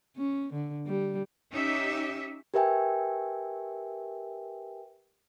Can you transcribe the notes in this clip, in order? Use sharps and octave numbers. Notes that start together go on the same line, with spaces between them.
C#4
D3
G3
C#4 D#4 G4 E5
G4 A#4 B4 E5 G5 G#5